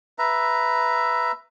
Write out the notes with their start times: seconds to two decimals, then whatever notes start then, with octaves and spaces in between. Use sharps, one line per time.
0.19 B4 E5 A#5